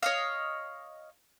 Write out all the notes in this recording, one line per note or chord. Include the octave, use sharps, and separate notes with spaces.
C#5 D#5 F5